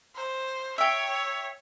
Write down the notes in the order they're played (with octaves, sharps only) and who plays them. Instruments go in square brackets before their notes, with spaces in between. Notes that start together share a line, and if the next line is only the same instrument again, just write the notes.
[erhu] C5
[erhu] C#5 [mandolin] E5 G5